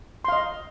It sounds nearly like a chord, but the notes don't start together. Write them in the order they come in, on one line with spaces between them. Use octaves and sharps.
C6 F5 D#5